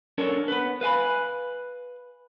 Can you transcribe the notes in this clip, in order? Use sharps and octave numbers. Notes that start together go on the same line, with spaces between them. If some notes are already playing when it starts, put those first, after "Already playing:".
C#4 D4 A4 A#4 C#5
B3 B4
B4 F5 G#5 B5